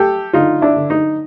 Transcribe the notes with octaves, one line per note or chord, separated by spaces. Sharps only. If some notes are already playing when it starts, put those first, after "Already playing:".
Already playing: A3 G4 A4
D3 D#4 F4
D4 E4
D3
D#4